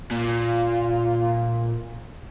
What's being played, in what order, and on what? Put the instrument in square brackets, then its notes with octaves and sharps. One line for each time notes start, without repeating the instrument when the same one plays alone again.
[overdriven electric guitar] A#2 [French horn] F4